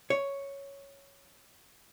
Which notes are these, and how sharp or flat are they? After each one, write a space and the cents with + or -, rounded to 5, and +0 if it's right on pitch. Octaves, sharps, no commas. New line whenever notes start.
C#5 +0